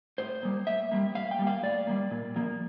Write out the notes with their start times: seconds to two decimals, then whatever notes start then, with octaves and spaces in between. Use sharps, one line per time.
0.18 A2 C5
0.43 G3 A#3
0.67 A2 E5
0.91 G3 A#3
1.15 A2 F5
1.31 G5
1.39 G3 A#3
1.47 F5
1.63 A2 D5
1.87 G3 A#3
2.11 A#2
2.36 F3 A#3